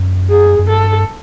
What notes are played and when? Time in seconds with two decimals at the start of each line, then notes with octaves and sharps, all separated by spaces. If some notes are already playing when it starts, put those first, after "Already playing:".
Already playing: F#2
0.30 G#4
0.59 F#2
0.69 G2 A4